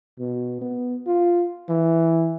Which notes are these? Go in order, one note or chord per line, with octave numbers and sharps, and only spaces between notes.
B2
B3
F4
E3